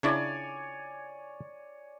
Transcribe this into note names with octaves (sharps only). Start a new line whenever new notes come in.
C#3 D4 E4 C#5 D5 G#5